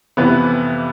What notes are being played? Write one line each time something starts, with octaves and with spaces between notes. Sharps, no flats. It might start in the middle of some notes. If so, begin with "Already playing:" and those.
F2 C3 E3 B3 B4